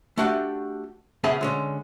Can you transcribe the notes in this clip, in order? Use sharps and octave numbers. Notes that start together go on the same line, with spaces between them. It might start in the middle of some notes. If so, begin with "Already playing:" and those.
A3 D4 F#4 G4 F#5
C#3 B3 C#4 G#4 E5 A5
D3 G#3 C#4